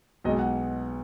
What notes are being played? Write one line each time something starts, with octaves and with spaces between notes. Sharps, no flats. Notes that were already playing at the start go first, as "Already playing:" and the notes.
B1 B2 G#3 D#5
F#5